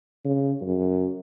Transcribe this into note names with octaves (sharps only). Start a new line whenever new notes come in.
C#3
F#2